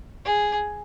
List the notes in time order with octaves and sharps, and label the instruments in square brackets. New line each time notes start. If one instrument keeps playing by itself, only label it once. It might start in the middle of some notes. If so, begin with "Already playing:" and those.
[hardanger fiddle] G#4